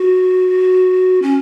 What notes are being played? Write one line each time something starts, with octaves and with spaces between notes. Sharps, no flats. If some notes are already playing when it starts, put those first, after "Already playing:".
Already playing: F#4
C#4